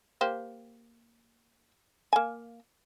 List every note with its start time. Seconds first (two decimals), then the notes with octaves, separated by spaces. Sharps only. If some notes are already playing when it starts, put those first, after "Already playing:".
0.21 A#3 G4 C5
2.13 A#3 G#5